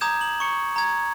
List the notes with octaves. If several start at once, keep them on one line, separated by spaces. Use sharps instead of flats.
A#5 D6 D#6 G6 G#6 E7
F#7
C#6 C#7
A#5 G#6